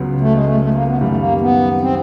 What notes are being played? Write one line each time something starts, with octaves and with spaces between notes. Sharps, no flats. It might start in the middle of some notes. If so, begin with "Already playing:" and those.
Already playing: C#2 C#3 F#3 B3
A3
G#3
A3
A3
A#3
B3
F#2 D#3 G3 A#3
A3
A#3
B3
C4